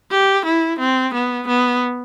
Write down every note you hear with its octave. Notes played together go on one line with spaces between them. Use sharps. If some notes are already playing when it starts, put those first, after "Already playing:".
G4
E4
C4
B3
B3